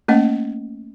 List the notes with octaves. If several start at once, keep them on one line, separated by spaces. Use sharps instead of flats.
A3 A#3 C#4 D#5